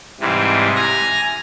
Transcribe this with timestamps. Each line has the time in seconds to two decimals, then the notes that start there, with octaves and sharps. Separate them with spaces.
0.20 G#2 C3 E3 G3
0.76 G#5 A#5 A#6